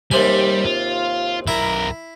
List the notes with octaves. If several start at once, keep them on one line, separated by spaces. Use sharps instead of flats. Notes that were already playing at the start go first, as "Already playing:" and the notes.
D#2 C3 G3 G#5
F4
B1 E4 A#4